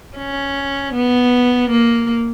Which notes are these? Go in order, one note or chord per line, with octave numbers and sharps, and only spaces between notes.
C#4
B3
A#3